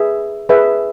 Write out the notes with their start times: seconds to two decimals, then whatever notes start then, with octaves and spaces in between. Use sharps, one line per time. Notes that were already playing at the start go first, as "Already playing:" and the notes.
Already playing: G#4 B4 E5
0.49 G#4 B4 E5